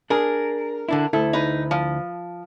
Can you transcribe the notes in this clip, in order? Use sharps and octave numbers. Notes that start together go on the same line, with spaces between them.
D4 G#4 A#4
D3 D4 E4
D2 E4 A4
D#4 B4
F3